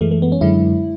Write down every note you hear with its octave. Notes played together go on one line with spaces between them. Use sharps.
F#2 E3 G#3 A3
A3
B3
C#4
F#2 D3 G#3 E4